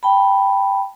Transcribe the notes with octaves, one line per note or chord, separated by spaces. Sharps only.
G5 A5 B5